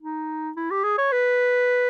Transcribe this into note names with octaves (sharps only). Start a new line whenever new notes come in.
D#4
E4
G4
G#4
C#5
B4